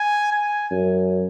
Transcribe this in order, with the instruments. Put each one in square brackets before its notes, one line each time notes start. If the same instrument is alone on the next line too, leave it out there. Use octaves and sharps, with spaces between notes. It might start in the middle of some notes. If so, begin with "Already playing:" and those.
Already playing: [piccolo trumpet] G#5
G#5
[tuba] F#2